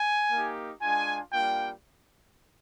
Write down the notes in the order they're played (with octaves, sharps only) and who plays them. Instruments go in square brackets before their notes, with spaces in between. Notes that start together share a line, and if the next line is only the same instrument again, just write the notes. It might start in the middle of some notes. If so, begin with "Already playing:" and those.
Already playing: [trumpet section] G#5
A#3 D#4 G4
G#3 D4 F4 G#5
G3 A#3 D4 F4 G5